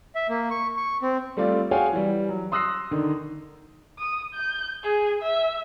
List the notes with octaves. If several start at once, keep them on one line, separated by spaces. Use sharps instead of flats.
E5
A#3
C#6
C#6
C4
G3 A3 C4 F4 D5
F#4 G#4 C#5 F5 G5 G#5
E3 G3
F#3
C6 D#6 E6 F#6 A#6 C7
D3 D#3
D#6
G6
G#4
E5